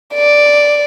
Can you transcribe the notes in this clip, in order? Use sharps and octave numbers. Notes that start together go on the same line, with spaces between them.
D5